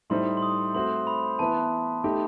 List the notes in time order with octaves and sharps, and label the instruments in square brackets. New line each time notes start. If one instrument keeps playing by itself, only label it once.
[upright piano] A2 G3 D#4 A4 C5 [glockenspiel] C6
[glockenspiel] D#6
C6
D#6
[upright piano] A3 C4 F#4 C5 [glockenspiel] C6
[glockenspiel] B5
[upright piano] E3 B3 E4 B4 [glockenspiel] A5
[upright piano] A3 D#4 G4